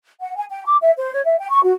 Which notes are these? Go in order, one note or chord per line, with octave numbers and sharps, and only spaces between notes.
F#5
G#5
G5
D6
E5
C5
C#5
E5
G5
C#6
F#4